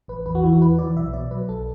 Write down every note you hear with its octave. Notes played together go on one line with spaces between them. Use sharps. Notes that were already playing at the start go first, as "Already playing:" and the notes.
A1 B4
E2 B4
F#4
E3 E4
F#4
E2 B4
E3 D5
B1 E5
B2 D5
F#3 B4
B1 A4